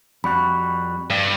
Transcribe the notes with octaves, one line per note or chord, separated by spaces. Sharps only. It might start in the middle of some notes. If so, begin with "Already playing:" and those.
F2 G3 F#4 B5
G2